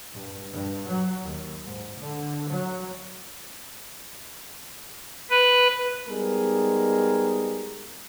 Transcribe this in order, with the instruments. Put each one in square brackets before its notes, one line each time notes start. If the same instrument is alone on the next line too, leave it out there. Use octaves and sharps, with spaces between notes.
[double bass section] G2
G2
F#3
D#2
G#2
D3
F#3
[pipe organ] B4
[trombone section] G3 G#3 B3 D#4 G#4 A#4